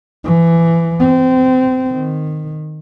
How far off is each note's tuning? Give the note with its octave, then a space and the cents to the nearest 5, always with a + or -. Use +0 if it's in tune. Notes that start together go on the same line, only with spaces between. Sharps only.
E3 +20
C4 -25
D#3 -15